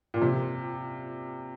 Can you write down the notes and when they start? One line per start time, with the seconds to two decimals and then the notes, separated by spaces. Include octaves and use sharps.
0.14 A#2
0.21 C3